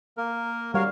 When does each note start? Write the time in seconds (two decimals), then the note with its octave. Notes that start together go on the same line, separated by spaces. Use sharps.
0.17 A#3 A#4
0.74 G3 F#4 A#4 C#5 F5